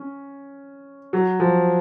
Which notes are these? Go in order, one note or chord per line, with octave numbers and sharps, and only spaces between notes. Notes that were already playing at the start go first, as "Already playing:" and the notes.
Already playing: C#4
F#3
F3